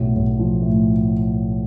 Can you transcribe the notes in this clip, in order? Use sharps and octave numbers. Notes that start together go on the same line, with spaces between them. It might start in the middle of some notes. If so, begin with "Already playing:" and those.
Already playing: B1 A2
B1
F3
A2